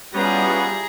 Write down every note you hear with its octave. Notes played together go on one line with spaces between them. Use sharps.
G3 B3 C#4 E4 F4 G#4 A#5